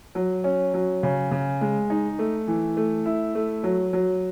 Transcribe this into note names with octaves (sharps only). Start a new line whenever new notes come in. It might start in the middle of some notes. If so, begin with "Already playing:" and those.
F#3
C#4
F#3
C#3
C#3
G#3
D#4
A3
E3
A3
E4
A3
F#3
F#3